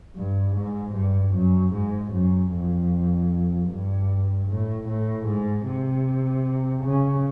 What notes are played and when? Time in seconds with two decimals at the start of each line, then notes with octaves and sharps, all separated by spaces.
0.16 G2
0.55 G#2
0.95 G2
1.34 F#2
1.73 G#2
2.13 F#2
2.52 F2
3.69 G2
4.49 A2
4.87 A2
5.26 G#2
5.66 C3
6.84 C#3